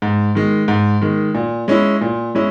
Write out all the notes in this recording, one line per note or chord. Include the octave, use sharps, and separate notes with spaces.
G#2
D#3 G#3
G#2
D#3 G#3
A#2
G#3 C#4 E4
A#2
G#3 C#4 E4